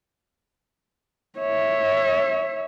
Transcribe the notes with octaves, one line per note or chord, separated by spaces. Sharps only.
C#5 E5